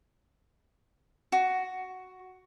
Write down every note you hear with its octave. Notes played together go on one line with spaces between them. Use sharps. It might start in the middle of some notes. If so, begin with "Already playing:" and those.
F#4